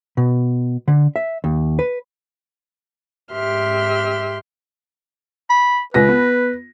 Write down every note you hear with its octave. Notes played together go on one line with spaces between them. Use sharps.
B2
D3
E5
D#2
B4
G#2 G4 E5 C6 F6
B5
C#2 B4 A#6
B3